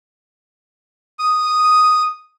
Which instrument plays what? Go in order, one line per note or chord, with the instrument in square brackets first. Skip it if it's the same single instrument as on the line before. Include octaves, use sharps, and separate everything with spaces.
[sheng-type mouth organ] D#6